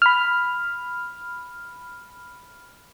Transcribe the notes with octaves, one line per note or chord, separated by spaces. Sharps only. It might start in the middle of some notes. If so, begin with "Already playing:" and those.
B5 F6